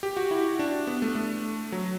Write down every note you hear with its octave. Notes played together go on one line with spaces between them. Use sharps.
G4
F#4
E4
D4
B3
A3
A3
F#3